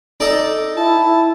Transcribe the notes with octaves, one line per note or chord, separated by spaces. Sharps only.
D#4 A4 D5 D#5
E4 A5